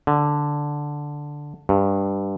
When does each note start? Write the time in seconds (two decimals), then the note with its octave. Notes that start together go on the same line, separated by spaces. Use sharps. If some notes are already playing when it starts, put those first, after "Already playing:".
0.07 D3
1.69 G2